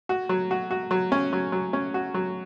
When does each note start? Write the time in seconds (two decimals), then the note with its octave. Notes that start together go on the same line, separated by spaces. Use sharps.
0.09 F#4
0.29 F#3
0.51 F#4
0.71 F#4
0.91 F#3
1.12 C#4
1.33 F#3
1.52 F#3
1.73 C#4
1.94 F#4
2.14 F#3